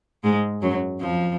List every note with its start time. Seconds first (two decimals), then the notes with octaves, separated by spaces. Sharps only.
0.24 G#2 G#3
0.62 F#2 F#3
1.00 F2 F3